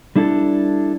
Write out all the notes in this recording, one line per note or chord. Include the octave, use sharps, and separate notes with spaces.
G3 D4 E4 A4